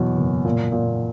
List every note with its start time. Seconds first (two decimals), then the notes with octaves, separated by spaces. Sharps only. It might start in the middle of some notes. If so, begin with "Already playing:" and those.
Already playing: E2 B2 F#3
0.17 F#1
0.44 A#2
0.72 A#2